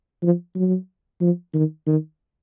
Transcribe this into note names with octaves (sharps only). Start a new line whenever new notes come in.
F3
F#3
F3
D#3
D#3